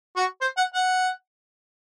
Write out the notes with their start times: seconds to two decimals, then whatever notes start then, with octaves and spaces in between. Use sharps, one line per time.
0.16 F#4
0.41 C5
0.57 F#5
0.74 F#5